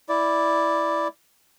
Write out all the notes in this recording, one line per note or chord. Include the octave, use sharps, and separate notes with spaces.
E4 D5